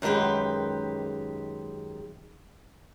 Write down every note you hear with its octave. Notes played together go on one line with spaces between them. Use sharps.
F#2 D#3 G#3 G4 B4